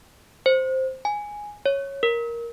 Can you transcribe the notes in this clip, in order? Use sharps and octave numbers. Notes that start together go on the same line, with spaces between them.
C5
G#5
C#5
A#4